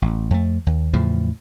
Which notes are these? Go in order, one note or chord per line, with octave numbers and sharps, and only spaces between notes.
A1
F2 A3
D#2
E2 A2 C#3 F3